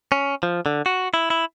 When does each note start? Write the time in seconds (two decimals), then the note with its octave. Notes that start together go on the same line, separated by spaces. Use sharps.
0.12 C#4
0.43 F3
0.66 D3
0.86 F#4
1.14 E4
1.30 E4